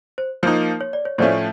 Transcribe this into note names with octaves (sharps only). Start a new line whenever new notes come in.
C5
F3 A#3 D#4 C5
C#5
D5
C#5
A2 F3 A3 C#4 C5 D5